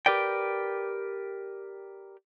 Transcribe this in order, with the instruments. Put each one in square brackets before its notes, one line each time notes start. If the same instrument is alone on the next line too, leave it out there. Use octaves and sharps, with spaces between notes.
[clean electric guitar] G4 A#4 B4 D5 G5